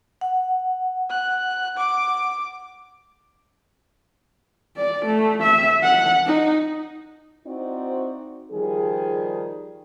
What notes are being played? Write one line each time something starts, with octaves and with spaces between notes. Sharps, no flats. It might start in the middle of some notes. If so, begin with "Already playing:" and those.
F#5
F#6
D6
D5
A3
E5
F#5
D#4
C4 D#4 E4 F#4 C5 D5
D#3 F3 G3 G#4